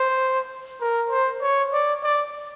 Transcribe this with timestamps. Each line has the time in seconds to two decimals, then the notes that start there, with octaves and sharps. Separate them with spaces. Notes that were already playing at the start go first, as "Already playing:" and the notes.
Already playing: C5
0.81 A#4
1.10 C5
1.41 C#5
1.73 D5
2.03 D5